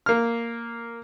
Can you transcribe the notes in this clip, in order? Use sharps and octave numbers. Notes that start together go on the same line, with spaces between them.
A#3 F6